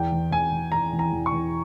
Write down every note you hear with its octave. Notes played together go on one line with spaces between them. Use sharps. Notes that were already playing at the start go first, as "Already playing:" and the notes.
Already playing: E2 G5
E3
E2 G#5
E3
E2 A#5
E3
A#5
E2
C#6
E3